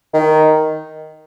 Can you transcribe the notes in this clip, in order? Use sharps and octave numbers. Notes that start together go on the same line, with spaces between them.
D#3